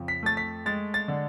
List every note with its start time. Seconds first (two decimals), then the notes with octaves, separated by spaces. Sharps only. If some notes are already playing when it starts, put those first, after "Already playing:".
Already playing: F2 C#3
0.08 B6
0.23 A3 A6
0.37 B6
0.66 G#3 A6
0.94 A6
1.08 D3